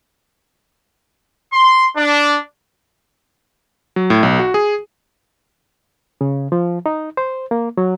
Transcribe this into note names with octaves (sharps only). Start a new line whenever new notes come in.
C6
D4
F#3
A2
B1
F#4
G#4
C#3
F3
D#4
C5
A#3
F#3